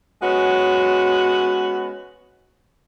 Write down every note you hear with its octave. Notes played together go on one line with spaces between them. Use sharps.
G#3 B3 C#4 F#4